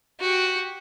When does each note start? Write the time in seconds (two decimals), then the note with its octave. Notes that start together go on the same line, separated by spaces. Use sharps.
0.20 F#4 G4